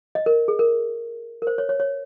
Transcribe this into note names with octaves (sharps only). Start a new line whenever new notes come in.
D#5
A#4
G#4
A#4
A#4
C5
C#5
C#5
C#5